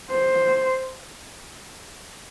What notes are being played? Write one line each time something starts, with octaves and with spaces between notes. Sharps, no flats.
C5